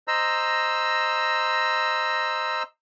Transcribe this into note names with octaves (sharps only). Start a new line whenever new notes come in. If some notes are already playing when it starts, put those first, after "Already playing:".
C5 D#5 A#5 E6